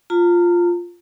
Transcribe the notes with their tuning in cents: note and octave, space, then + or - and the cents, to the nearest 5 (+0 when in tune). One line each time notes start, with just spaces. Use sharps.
F4 +0 A#5 -40